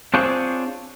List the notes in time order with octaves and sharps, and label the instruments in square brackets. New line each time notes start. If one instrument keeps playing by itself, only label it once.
[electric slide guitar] C4 D4 F4 G#4 C5 C#5